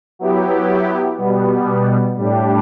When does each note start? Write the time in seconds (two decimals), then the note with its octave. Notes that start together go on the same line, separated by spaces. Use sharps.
0.19 F#3 B3 E4 G4
1.18 B2 G3 B3
2.17 A2 G3 D4 G4